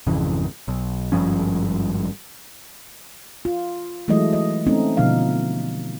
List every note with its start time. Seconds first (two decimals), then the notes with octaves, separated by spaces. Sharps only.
0.07 G#1 F2 C#3 E3
0.68 B1
1.12 G#1 G2 F3 C#4
3.45 F4
4.08 E3 F#3 G#3 A3 E4 D#5
4.33 D#5
4.67 A3 C4 C#4 D#4
4.97 B2 D3 F3 D#4 F5